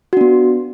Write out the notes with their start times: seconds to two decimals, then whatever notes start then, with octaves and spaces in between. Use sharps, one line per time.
0.13 F#4
0.17 D4
0.21 B3